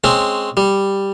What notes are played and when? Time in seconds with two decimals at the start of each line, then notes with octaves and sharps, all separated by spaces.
0.04 G#3 C4 C#4
0.57 G3